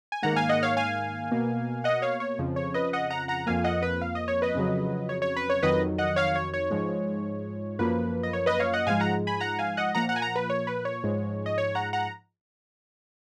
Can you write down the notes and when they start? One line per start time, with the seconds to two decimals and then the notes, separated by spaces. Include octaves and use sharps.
0.12 G#5
0.23 G#2 D#3 A#3 F#5 A#5
0.36 F5 G#5
0.49 D#5 F#5
0.63 C#5 F5
0.77 F5 G#5
1.31 B2 A#3
1.84 D#5 F#5
2.02 C#5 F5
2.20 C#5
2.38 F2 C#3 F3
2.56 C#5
2.74 B4 D#5
2.93 D#5 F#5
3.10 F#5 A#5
3.28 F#5 A#5
3.46 F2 F3 A#3 F5 G#5
3.64 D#5 F#5
3.82 B4
4.01 F5
4.15 D#5
4.28 C#5
4.42 B4 D#5
4.55 F2 C#3 F#3
5.09 C#5
5.22 C#5
5.37 B4
5.50 C#5
5.63 F2 D#3 F#3 B4 D#5
5.98 D#5 F#5
6.16 C#5 F5
6.36 C#5
6.54 C#5
6.71 G#2 F3 G#3
7.79 F#2 F3 A#3 B4
8.23 D#5
8.33 C#5
8.46 B4 D#5
8.60 C#5 F5
8.73 D#5 F#5
8.87 G#2 F3 G#3 F5 G#5
9.00 F#5 A#5
9.27 G#5 B5
9.40 F#5 A#5
9.59 F5 G#5
9.77 D#5 F#5
9.95 A#2 F3 A#3 F#5 A#5
10.09 F#5 A#5
10.16 G#5
10.22 F#5 A#5
10.36 B4
10.50 C#5
10.67 B4
10.85 C#5
11.04 G#2 F3 G#3
11.46 D#5
11.58 C#5
11.75 F#5 A#5
11.93 F#5 A#5